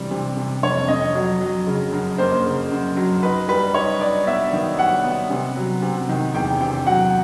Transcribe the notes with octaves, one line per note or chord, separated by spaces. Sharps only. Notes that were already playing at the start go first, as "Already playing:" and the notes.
Already playing: C3 E3 G3
C3
C3
F2 C#5
F2 D#5
F#3
F#3
C#3
F#2
A#3 C5
C#3
F#2
F#3
D#4 B4
G3 B4
D#4 C#5
D#4 D5
B3 E5
D#3
G3 F#5
B3
C3
F#3
C3
D#3
E2 G5
C3 G5
F#3 F#5